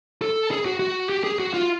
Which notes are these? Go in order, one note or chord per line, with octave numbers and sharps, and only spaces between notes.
A4
G#4
F#4
F#4
G4
G#4
F#4
F4